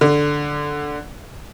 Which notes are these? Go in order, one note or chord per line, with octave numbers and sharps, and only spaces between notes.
D3